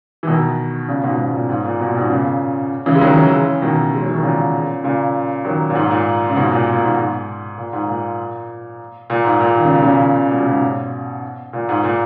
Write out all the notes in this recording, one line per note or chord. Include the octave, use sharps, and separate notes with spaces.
E3
B2 D#3
A#2 C#3
G#2 B2
G#2 B2
A#2
G#2
A#2
B2
A#2
G#2 B2
A#2 C#3
C#3 E3
G#3
D#3 F#3
C#3 E3
B2 D#3
G#3
F#3
E3
D#3
A#2 C#3
A#2 C#3
D#3 F#3
A#2
G#2
G#2
A#2
C#3
G#2 B2
A#2
A#2
G#2
G#2
A#2
G#2
A#2
A#2
G#2
A#2
D#3
C#3
B2
A#2 C#3
B2
C#3
G#2 B2
A#2
G#2
A#2